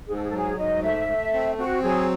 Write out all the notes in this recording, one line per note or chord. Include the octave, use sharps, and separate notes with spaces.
G#2 G#4
A4
G#4
A4
F#3 G#4
G#2 D#5
A3 E5
A3
C4
C4 F#4
F#3 G#4